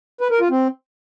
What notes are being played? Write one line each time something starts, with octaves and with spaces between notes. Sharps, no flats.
B4
A#4
F4
C4